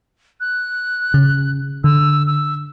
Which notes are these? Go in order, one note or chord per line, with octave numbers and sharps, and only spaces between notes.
F#6
C#3
D3 E6
E6